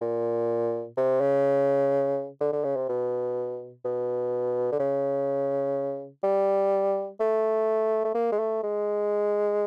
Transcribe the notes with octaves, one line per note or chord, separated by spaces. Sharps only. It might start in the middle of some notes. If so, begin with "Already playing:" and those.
A#2
C3
C#3
D3
D3
C#3
C3
B2
B2
D3
C#3
G3
A3
A3
A#3
G#3
A3
G#3